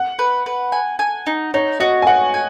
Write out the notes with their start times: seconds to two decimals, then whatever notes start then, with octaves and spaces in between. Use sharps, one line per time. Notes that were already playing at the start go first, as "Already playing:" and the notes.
Already playing: F#5
0.19 B4
0.46 B4
0.72 G#5
0.99 G#5
1.26 D#4
1.54 D#4 C#5
1.80 F#4 D#5
2.02 G#5
2.07 F#4 F#5
2.34 G#5